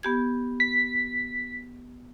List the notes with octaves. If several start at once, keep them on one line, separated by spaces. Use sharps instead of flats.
B3 G4 G#6
B6